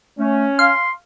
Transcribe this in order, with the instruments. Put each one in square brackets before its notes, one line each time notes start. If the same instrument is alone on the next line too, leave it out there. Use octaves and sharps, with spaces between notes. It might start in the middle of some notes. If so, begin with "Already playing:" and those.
[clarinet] A3 [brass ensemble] C#4
[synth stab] F5 [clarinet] C6